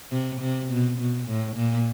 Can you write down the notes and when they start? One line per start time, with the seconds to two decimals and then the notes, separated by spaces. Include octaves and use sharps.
0.12 C3
0.41 C3
0.70 B2
0.99 B2
1.28 A2
1.57 A#2